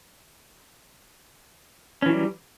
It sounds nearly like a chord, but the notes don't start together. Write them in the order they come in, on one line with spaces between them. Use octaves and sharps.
C#4 E3 F#3 G3